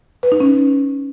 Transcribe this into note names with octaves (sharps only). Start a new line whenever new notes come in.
B4
D#4
C#4